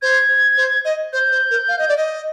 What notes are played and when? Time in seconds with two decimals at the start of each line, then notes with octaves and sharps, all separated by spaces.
0.02 C5 G#6
0.57 C5
0.85 D#5
1.13 C5 G6
1.32 C5
1.50 A#4
1.68 F5
1.79 D#5
1.88 D5
1.97 D#5